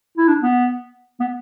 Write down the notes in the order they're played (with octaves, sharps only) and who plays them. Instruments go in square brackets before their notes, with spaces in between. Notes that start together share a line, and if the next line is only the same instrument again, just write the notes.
[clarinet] E4
D4
B3
B3